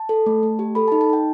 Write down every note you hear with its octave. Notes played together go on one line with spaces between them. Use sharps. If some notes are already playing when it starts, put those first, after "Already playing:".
Already playing: A5
A4
A3
A3
G4
A4 B5
D#4 A5
A5
D#4 G5